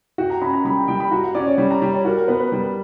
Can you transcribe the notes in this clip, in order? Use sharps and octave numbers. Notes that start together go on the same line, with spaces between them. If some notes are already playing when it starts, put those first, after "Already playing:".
F#4 G5
A#5
C#4 B5
A#5
G3 B5
G5
G3 G5
B5
F#4 A#5
F#5
C#4 D5
C#5
G3 C#5
A#5
G3
C#5
F#4 A#4
A#4
B3 B4
B4
G3